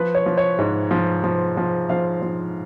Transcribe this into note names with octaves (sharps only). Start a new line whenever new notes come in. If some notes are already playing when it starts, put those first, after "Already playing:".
Already playing: F3 B4
C#5
F3
C#5
G#2
F3
F3
F3
F3 F5
F3